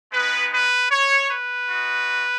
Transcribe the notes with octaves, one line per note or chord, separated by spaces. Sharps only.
G#3 B3 D#4 B4
B4
C#5
B4
G#3 D#4 F#4